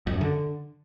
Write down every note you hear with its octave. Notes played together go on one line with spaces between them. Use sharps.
F2
F#2
D3